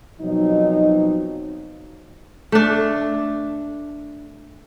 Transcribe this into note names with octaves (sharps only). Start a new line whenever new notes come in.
B2 F3 F#3 C4 D#4
A3 D4